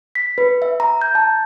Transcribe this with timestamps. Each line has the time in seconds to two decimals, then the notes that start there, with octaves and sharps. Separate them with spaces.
0.15 B6
0.38 B4
0.62 E5
0.80 A#5
1.01 G6
1.15 A5